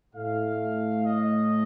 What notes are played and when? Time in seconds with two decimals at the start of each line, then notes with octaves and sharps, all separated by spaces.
0.15 A2 A3 F5
1.05 D#5